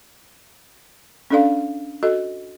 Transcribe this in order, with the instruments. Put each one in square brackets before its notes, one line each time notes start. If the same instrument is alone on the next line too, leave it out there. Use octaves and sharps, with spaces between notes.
[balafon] C#4 D4 A4 D5 F5
F#4 A4 D#5